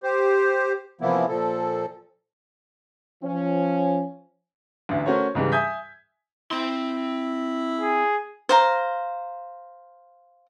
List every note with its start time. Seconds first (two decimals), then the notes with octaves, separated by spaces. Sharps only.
0.03 G4 C5
1.01 C3 E3 F3 A#3 B3 E4
1.28 A#2 F3 A4
3.23 F3 C#4
4.89 A1 D2
5.06 A3 C#4 F#4 A#4 C5 C#5
5.35 C#2 G#2 E3 G3
5.52 E5 G#5 D#6 G6 G#6 B6
6.51 C4 E4 C6
7.80 G#4
8.49 C5 F5 A#5